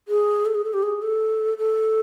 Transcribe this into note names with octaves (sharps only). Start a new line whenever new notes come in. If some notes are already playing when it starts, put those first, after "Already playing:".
G#4
A4
G#4
A4
G4
G#4
A4
A4